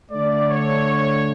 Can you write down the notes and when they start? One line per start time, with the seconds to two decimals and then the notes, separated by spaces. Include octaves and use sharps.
0.11 D3 A3 D5
0.50 C#5